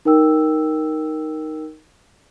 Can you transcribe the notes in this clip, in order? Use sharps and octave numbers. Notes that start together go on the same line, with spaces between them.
D#4 A#4 G5 E6